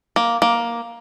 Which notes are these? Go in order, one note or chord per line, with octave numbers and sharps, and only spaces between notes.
A#3
A#3